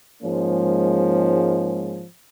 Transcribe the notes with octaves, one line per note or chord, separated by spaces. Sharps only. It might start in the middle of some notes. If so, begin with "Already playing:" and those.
G#2 F3 G#3 A#3 C#4